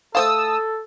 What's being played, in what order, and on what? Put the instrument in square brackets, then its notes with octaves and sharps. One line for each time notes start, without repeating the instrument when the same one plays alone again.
[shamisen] A3 C5 F5 [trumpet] A4 [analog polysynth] A5 D#6 E6